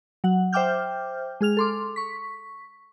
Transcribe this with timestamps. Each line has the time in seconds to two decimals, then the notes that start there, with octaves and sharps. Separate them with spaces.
0.24 F#3 F#5
0.53 C5 E5 G5 D6 F6 G6
1.41 G#3 G#4 F6 F7
1.57 A4 C6 D6
1.96 C#6 B6